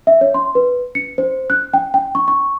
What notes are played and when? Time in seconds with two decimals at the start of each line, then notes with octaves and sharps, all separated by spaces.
0.07 E5
0.21 C#5
0.34 C6
0.55 B4
0.95 C#7
1.18 C5
1.50 F#6
1.74 G5
1.94 G5
2.15 C#6
2.28 C#6